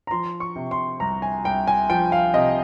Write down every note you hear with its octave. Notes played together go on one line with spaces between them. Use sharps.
A#5
F3 C6
C#6
C3
C6
C2 A#5
G#5
C2 G5
G#5
F3 G5
F5
C3 D#5